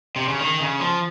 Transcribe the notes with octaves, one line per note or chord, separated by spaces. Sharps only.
C3
C#3
D#3
C#3
F3